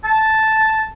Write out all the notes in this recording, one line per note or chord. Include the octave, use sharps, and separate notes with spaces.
A5